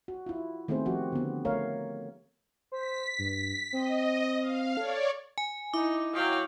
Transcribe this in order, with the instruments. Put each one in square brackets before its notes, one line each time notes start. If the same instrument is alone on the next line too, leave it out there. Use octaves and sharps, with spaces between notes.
[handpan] F#4
E4 F4
D#3 A3 B3 C4 G#4 C5
F3 F#4 G4
D3 B3
A3 A#4 C#5 F5
[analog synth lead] C5 [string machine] B6
[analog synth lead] G2
[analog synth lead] C4 [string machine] D#5
[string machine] F5
[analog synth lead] A4 [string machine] C#5 D5
[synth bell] G#5
[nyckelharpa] D#4 [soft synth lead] E4 [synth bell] D6
[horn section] F#3 [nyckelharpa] F5 G5